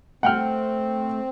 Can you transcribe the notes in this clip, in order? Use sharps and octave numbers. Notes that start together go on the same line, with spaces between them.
A3 C4 F#5 G5 F6